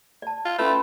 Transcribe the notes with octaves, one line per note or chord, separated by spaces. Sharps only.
D5 A5
F4
A3 C#4 F4 B4 B5 C6